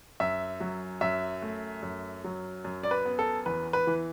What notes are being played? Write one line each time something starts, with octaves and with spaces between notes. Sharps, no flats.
F#2 E5
F#3
F#2 E5
A3
F#2
F#3
F#2
D5
B4
B3
A4
E2 B4
B4
E3